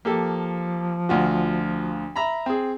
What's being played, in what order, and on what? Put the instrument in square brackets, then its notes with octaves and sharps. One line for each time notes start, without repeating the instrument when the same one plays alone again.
[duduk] F3 [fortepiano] A#3 G4 A4
[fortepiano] D2 F4 F#4
E5 A#5 B5
C4 G#4